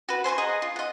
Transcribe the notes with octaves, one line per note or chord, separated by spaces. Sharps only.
F#4 B4
C5 G#5 B5 C#6
G#4 D#5 F#5 A#5
F4
D#5 F#5